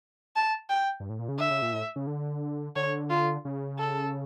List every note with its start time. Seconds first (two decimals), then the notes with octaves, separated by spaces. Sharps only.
0.36 A5
0.70 G5
1.00 G2
1.09 A2
1.19 A#2
1.29 C#3
1.39 D3 E5
1.51 C#3
1.62 A#2
1.72 A2
1.96 C#3
2.07 D3
2.76 D3 C#5
3.10 F4
3.45 C#3
3.79 A4